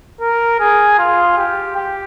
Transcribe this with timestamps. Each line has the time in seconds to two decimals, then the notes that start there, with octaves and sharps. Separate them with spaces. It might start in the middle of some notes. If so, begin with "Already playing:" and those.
0.21 A#4
0.60 G#4
0.99 F4
1.38 G4
1.76 G4